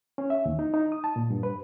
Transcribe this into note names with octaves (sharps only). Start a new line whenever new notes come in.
C#4
E5
D#2
D#4
D#4
D#6
A5
A#2
G2
B4